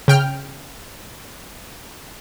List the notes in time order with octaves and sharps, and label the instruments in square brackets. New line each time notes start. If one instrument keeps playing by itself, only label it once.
[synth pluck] C#3 G5 F6